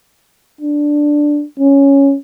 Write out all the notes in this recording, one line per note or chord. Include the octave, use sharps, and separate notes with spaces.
D4
C#4